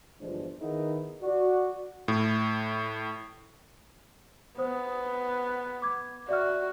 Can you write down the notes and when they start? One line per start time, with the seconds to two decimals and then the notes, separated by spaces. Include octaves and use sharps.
0.20 G1 E3 F3 G#3 D4 C5
0.61 D#3 B3 D#4 E4 G#4 A#4
1.23 F#4 D5
2.08 A2
4.58 B3 C5 D#6
5.82 D6 G#6
6.29 F#4 D5 E5 F6